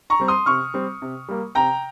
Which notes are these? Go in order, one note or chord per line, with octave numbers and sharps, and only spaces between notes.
A#5 C#6
G3 C4
C6 D#6
C3 C#6 F6
G3 C4
C3
G3 A#3
C3 G5 A#5